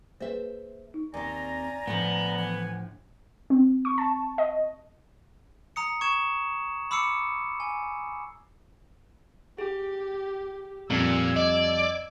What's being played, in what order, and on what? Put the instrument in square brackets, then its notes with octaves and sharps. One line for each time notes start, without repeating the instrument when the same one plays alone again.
[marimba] A#3 G#4 B4 [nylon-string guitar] C5 E5
[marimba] D#4
[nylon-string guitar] D#2 C4 [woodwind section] D5 G#5 A#5
[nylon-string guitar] A2 D3 F3 [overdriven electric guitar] B3
[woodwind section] E3 F#5 G#5
[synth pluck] C4
C#6
A5
D#5
[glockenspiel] A#5 D#6 C#7
C#6 G#6 E7
B5 D6 E6 C7 C#7
G#5
[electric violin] G4 [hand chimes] G#4
[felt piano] F2 G3 [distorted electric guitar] A#2 [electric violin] E6 G#6
[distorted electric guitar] D5 [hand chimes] D#5